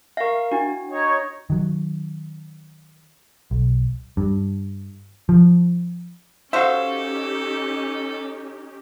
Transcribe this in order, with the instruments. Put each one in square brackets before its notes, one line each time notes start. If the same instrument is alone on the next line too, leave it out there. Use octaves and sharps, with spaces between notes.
[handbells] A#4 F5 [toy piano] E5 C#6
[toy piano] D4 E4 G5 [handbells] F#4
[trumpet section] D#4 C#5
[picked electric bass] D#3 F#3
B1
G2
F3
[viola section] C#4 D#4 G4 [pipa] F#4 C5 [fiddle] A4 [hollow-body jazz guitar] E5 F5